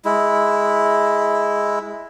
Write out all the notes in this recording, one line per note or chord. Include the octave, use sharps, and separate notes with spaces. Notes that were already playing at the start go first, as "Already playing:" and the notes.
G#3 E4